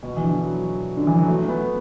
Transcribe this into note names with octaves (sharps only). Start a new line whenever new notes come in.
B2
E3
D3
F#3
D3
E3
F#3
A3
B3